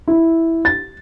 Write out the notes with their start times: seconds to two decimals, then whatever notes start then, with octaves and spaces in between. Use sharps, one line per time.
0.08 E4
0.65 A6